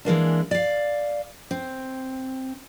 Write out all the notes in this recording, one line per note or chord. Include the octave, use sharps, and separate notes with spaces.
E3 G#3 A#3 D4
D5 F5
C4